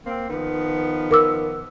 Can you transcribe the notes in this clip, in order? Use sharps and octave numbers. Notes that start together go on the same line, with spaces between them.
A#3 C4
D#3 F3 B3
A#4 D6 E6